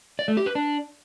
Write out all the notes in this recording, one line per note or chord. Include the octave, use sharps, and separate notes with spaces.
D5
A3
G4
B4
D4